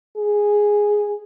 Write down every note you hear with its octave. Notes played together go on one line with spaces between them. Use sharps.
G#4